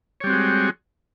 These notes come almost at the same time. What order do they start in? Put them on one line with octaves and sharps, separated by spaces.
C#5 G3 C4 F#4 G#3